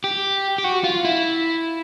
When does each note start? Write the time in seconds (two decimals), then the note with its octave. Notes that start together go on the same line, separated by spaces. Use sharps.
0.04 G4
0.58 G4
0.64 F#4
0.84 F4
1.05 E4